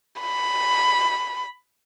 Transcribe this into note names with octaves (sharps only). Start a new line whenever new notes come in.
B5